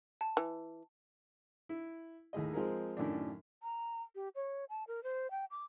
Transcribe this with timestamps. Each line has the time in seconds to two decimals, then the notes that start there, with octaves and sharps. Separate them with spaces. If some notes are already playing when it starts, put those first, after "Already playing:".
0.21 A5
0.37 E3
1.69 E4
2.33 D#2 A2 G#4 D#5
2.53 F3 G#3 C4 G#4 A#4
2.97 F#2 A2 D#3 D4
3.63 A#5
4.15 G4
4.35 C#5
4.69 A5
4.88 A#4
5.04 C5
5.31 G5
5.51 D6